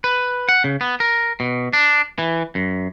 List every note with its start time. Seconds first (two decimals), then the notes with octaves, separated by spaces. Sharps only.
0.04 B4
0.49 F#5
0.64 C#3
0.81 B3
1.00 A#4
1.40 B2
1.73 D4
2.18 E3
2.55 F#2